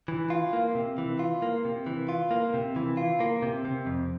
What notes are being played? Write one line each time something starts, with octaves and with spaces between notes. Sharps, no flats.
E3
F4
A#3
C3
E3
F4
A#3
C3
E3
F4
A#3
C3
E3
F4
A#3
C3
C3
F2